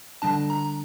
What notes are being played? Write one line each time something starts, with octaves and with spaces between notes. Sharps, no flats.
D3 G3 D4 A5
A#5